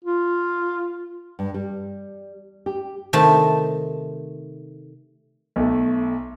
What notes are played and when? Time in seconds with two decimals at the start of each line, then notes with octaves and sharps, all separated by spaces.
0.05 F4
1.39 G2
1.54 G3
2.66 G4
3.13 C3 D#3 A3 A5
5.56 B1 A3